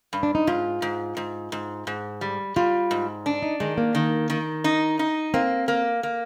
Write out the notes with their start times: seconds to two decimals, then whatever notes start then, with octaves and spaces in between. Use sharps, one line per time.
0.13 G2
0.23 D4
0.35 D#4
0.47 G#2 F4
0.82 G#2
1.17 G#2
1.52 G#2
1.87 G#2
2.21 G3
2.56 G3 F4
2.91 G#2
3.26 D4
3.43 D#4
3.60 D#3 G#3
3.78 A#3
3.95 D#3
4.30 D#3
4.64 D#4
4.99 D#4
5.34 A#3 C4
5.68 A#3
6.03 A#3